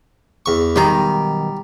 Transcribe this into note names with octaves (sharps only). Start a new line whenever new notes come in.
E2 C#6
B1 D#3 G3 A#5